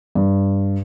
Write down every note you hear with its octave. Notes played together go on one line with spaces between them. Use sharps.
G2